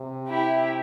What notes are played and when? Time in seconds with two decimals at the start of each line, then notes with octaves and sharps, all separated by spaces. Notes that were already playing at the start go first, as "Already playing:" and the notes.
Already playing: C3
0.28 E4 G4